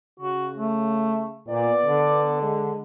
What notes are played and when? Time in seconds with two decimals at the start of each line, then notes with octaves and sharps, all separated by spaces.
0.20 C#3 F#4
0.56 A3
1.48 A#2 B3 D5
1.86 D3
2.42 G#3